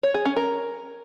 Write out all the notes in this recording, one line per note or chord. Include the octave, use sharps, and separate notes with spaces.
C#5
G#4
C#4
A#4